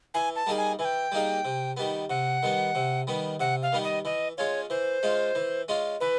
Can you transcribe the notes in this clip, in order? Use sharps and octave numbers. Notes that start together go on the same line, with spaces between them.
E3 G#5
A5
G3 A#3 D#4 G#4
G#5
E3 G#5
G5
G3 A#3 D#4 G#4
C3
D#3 G3 B3
C3 F#5
D#3 G3 B3
C3
D#3 G3 B3
C3 F#5
F5
D#3 G3 B3
D#5
E3 D#5
G#3 C#4 F4 C#5
E3 C5
G#3 C#4 F4
E3
G#3 C#4 F4
E3 B4